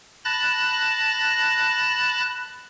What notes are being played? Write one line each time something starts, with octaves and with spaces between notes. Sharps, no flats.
A5 B5 F#6 A6 A#6